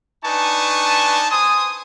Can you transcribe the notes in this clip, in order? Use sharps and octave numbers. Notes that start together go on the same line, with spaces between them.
D4 D#4 B4 G#5 A5 C#6
C5 G#5 C6 D#6